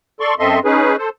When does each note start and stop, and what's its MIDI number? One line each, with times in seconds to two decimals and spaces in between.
0.20 0.35 69
0.20 0.35 74
0.20 0.35 84
0.20 0.35 85
0.39 0.59 42
0.39 0.59 60
0.39 0.59 69
0.39 0.59 75
0.39 0.59 76
0.39 0.59 84
0.65 0.96 61
0.65 0.96 63
0.65 0.96 68
0.65 0.96 71
0.98 1.09 69
0.98 1.09 72